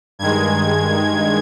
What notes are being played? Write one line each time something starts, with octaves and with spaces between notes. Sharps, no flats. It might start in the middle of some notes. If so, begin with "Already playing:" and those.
G2 D#3 G#3 G#6